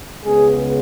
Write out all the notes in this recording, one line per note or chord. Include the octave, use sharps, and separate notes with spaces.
C#2 C#3 G#3 B3 G#4